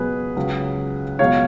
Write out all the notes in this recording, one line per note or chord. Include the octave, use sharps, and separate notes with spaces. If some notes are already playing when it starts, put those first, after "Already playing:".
Already playing: C#2 B2 F#3 G#4 B4
C#2 C#3 F#3
C#2 B2 F#3 C#5 F5